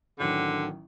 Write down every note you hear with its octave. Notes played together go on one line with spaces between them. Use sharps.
A1 D3 D#3 F#3